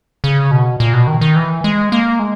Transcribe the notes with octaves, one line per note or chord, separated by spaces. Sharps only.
C#3
B2
A#2
B2
D#3
D#3
E3
G#3
A#3
G#3